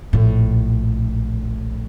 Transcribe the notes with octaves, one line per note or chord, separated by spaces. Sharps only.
A#1 A2